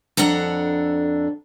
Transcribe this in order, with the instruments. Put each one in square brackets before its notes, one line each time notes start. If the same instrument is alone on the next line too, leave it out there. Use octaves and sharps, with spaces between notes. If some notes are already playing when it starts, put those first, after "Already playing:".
[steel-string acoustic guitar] F2 D4 A4 F#5 A#5